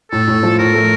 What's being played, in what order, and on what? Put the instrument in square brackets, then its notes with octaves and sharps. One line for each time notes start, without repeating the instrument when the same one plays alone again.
[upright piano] A2 [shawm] A4
[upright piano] A2
F3
[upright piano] A2 [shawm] A#4
[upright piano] A3